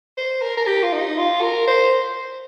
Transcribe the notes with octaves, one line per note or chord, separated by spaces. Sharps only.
C5
A#4
A#4
G4
F4
D#4
F4
A#4
C5